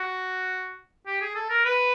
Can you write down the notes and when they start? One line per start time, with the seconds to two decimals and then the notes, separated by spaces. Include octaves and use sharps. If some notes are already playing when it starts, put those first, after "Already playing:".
Already playing: F#4
1.07 G4
1.21 G#4
1.35 A4
1.50 A#4
1.65 B4